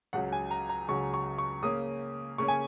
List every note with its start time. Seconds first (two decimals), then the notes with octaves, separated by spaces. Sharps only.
0.13 C#2 C#3 F#3 F#5
0.32 G#5
0.51 A#5
0.69 A#5
0.88 C#2 C#3 F#3 C#6
1.14 C#6
1.38 C#6
1.63 C#3 A#3 C#4 D#6
2.38 C#3 A#3 C#4 C#6
2.48 G#5